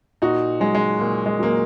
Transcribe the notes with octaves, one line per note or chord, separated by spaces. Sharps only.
A#2 D#4 F#4
F#3 G#3
G#3
A#2 A#3
G#3
F#3 A#3